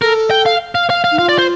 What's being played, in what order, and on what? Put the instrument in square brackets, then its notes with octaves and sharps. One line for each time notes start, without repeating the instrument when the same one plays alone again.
[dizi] A4 [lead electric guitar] A#4
[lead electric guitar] G5
F5
F5
F5
F5
[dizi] D#4
[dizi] F4 [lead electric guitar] F5
[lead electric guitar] D5
C5